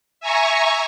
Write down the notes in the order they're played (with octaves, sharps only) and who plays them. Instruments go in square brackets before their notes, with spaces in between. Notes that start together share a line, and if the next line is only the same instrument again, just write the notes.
[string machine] E5 G#5 A#5 C#6